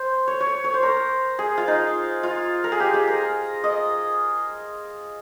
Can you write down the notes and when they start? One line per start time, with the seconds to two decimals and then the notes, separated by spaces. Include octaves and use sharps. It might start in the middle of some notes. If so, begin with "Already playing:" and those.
Already playing: C5
0.28 C#5
0.41 C#5
0.64 C#5
0.74 C5
0.83 A#4
1.39 G#4
1.58 F4
1.68 D#4
2.23 F4
2.64 A#4
2.72 G#4
2.80 G4
2.94 G#4
3.08 A#4
3.64 D#5